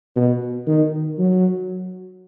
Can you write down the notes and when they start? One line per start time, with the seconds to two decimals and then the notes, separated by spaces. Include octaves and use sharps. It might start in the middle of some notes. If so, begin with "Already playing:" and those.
0.16 B2
0.67 D#3
1.18 F#3